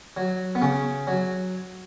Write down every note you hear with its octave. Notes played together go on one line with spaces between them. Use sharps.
F#3
B3
C#3 C#4
F#3